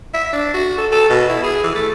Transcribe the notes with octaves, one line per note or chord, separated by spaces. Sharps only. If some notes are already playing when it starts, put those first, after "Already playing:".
E5
D4
F#4
A4
A4
B2
E4
G#4
E3
A3